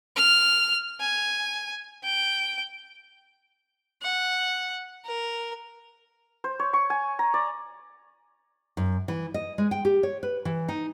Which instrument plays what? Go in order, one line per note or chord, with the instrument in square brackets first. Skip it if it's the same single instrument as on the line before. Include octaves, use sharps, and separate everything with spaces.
[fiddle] F6
G#5
G5
[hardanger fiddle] F#5
A#4
[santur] C5
C#5
C#6
G#5
A#5
D5
[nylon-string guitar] F#2
E3
D#5
G#3
G5
G4
C#5
B4
E3
D#4